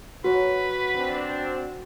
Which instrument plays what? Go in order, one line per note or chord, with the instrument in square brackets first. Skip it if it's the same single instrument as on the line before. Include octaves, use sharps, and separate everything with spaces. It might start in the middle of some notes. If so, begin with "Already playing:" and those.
[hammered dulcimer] F#3 F#5 [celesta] F#4 [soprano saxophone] B4
[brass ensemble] C4 D4